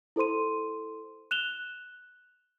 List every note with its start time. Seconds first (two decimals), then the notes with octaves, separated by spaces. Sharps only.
0.16 E4 A4 C5 C6 D#7
1.31 F#6 E7 F7 G7